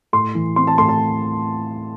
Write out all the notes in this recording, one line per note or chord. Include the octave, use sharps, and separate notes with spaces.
A2 C6
E3
C4 C6
A5
A2 C6
A5